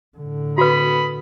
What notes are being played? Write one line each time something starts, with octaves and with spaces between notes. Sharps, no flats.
A2 D3
F#4 B4 B5 D#6